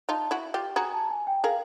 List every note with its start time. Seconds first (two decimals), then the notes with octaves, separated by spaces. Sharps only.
0.09 D#4 F4 A5
0.31 E4 F#4
0.54 F4 G4
0.76 F#4 G#4 A#5
0.94 A5
1.11 G#5
1.27 G5
1.43 G#4 A#4 F5